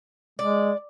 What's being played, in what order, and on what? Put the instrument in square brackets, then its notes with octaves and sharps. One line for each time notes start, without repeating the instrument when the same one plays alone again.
[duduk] G#3 [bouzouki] D5